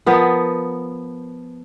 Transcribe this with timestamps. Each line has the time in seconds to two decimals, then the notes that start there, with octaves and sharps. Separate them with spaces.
0.06 F3 B3 A#4